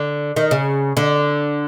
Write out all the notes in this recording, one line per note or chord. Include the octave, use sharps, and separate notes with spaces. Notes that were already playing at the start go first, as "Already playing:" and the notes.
Already playing: D3
D#3
C#3
D3